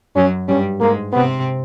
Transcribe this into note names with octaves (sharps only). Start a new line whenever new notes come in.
F#2 F#3 C#4
G2 G3 C#4
G#2 G#3 A#3
C3 B3 C4